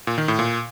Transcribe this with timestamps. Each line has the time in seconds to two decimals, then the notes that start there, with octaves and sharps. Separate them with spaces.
0.07 A#2
0.18 D#3
0.28 A2
0.39 A#2